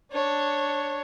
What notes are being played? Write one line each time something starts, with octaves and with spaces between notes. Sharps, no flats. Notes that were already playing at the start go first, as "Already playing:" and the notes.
D4 C#5